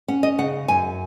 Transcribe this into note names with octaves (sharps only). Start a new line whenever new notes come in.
C#4 F#5
D#5
C#3 F#5
F#2 G#5